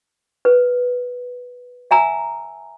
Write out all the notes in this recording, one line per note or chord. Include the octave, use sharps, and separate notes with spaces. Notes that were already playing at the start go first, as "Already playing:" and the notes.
B4
E5 G#5 A#5 E6